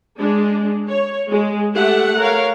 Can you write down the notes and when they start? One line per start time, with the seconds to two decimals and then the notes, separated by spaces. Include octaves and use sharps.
0.20 G#3 D4
0.88 C#5
1.31 G#3
1.73 A3 G4 E5 F#5
2.18 A#4 C#5 F5